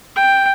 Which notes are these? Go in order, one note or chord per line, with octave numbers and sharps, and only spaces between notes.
G5